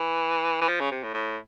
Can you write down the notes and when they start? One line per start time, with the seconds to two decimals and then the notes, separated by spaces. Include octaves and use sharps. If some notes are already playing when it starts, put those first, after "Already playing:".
Already playing: E3
0.61 E3
0.68 F3
0.80 C#3
0.91 C3
1.03 A2
1.14 A2